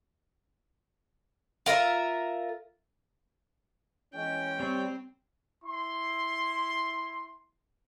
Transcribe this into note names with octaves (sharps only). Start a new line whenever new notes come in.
F4 A#4 C5 E5
E3 G#3 C#4 G5
G3 C4 C#5
E4 C6